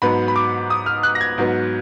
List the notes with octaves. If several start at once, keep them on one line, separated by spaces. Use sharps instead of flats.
G#2 F#3 B3 B5
B5
D6
D#6
F6
F#6
A#6
G#6
G#2 F#3 B3